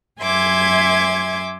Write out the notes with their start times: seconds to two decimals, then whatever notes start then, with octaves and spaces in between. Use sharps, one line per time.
0.21 F#2 E5 G#5 C6 D6 G#6